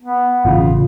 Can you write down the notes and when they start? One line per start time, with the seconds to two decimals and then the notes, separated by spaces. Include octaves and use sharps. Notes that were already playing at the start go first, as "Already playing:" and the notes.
0.02 B3
0.45 A1 C#3 F4